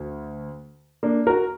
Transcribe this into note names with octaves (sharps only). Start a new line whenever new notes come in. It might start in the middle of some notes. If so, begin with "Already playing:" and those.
Already playing: D2
A#3 D4
F#4 A#4